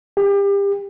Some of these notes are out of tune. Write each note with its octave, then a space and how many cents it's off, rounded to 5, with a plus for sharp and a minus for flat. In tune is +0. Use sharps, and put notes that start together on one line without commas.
G4 +30